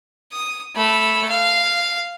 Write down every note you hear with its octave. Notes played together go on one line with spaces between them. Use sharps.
D#6
A3 B5
F5